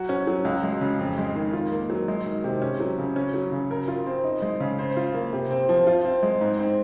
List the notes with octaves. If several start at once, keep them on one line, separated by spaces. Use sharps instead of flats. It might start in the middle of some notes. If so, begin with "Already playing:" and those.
Already playing: F#3 F#4
C#4
F#3
C#2
G#3
C#3
F2
G#3
D#3
F4
A#3
F#3
G#3
D#3
C3
C#4
F#3
C#3
C#4
F#3
C#3
A#4
F4
C4
D#4
G#3
C#3
C5
F4
A#3
C3
C4
F3
F4
C4
G#3
G#2
C4